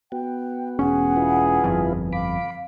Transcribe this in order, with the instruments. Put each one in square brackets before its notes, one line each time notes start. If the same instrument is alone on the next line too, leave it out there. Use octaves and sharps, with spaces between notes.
[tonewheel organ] B3 F#4 [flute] G5
[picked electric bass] E1 C#4 [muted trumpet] G#4 [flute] F#5
[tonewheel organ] E4 F4 B4
[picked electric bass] G1 F2
[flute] F5 [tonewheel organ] B5 D6